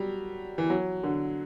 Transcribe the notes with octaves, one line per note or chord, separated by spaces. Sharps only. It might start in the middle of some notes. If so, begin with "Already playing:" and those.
Already playing: F#3 G3
E3
F#3
D3